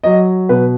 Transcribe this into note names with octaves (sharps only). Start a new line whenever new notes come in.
F#3 D#5
B2 B4